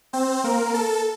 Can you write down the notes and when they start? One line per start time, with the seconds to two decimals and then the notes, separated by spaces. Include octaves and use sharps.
0.13 C4 C5
0.44 A#3 A#4
0.74 A4 A5